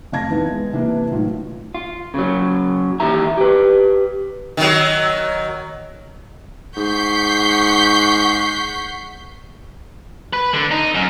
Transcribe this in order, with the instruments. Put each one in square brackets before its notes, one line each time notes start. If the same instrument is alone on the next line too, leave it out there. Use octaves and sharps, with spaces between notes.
[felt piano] F1 A3 F5 A5 G#6 A#6
D#3 E3 B3
G#3
C3 E3 A#3 D4 E4 B4
A2 D#3 F#3 F4
[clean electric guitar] F4
C#3 F#3
D#2 D#3 E3 G4 E5 A#5
G4 B4
[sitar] D#3 F#3
[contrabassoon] G#2 [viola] F#5 C#6 [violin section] G6 B6 C7
[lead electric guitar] B4
D3
D#4
F#2